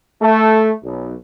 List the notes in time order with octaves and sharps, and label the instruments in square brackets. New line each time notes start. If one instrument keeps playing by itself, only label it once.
[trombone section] A3
B1